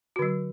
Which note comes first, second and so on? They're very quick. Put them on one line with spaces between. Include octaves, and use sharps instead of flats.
F#4 D3 F#3